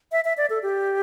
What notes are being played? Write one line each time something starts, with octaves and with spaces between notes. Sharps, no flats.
E5
E5
D5
A4
G4